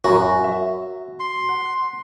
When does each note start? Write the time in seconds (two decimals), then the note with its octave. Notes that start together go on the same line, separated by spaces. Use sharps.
0.04 F#2 F#4
0.44 E5
1.20 C6
1.49 F#5